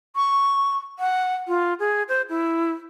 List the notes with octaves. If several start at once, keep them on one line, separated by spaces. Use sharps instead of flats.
C#6
F#5
F4
G#4
C5
E4